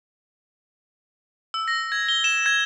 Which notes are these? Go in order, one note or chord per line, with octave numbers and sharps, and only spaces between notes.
E6
A#6
G#6
G7
E7
G#6